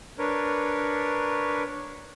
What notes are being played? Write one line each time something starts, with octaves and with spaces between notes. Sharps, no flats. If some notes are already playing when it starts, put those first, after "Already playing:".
D4 A#4 B4 C#5